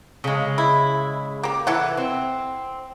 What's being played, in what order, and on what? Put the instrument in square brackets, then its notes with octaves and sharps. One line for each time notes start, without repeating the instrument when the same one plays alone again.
[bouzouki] C#3 G#3
[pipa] E4
A#3 G4
[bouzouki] E3 [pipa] E4 A4 F#5
[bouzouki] C4